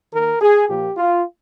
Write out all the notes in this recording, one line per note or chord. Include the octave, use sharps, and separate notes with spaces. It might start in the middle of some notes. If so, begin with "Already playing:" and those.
D#3 A#3 A#4
G#4
A#2 F3 A#3 G4
F4